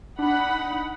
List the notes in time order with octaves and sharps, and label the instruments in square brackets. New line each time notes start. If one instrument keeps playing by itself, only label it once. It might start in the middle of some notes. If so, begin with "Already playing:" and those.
[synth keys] D4 [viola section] D#4 F#5 B5